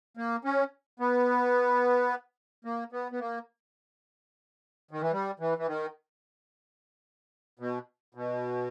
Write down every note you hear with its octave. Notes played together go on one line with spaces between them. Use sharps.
A#3
C#4
B3
A#3
B3
B3
A#3
D#3
E3
G3
E3
E3
D#3
B2
B2